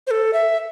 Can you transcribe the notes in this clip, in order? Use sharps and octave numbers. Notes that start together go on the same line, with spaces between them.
C5
A4
E5